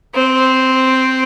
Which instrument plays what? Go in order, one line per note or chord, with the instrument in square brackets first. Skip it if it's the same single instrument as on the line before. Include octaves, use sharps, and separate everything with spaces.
[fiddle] C4